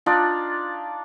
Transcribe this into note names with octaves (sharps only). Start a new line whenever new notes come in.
D4 D#4 F4 D5